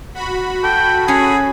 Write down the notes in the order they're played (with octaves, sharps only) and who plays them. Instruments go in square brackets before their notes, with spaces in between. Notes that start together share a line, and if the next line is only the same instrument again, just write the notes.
[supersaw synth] F#4 B5
[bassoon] A4 [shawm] G5
[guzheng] C#4 [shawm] G#4